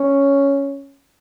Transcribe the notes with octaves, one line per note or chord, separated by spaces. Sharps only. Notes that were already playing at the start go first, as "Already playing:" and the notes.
Already playing: C#4